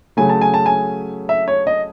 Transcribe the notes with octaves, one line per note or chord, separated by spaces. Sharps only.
C#3 F#3 A3 G#5
A5
G#5
A5
G#5
E5
C#5
D#5